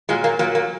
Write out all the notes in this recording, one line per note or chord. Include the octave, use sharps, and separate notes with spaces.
A#2 F#3 G#3
A#3
A#2 F#3 A#3
A#3